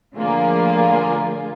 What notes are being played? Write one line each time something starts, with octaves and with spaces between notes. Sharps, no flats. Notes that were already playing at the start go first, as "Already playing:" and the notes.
A2 D3 F3 A#3 F4 G#4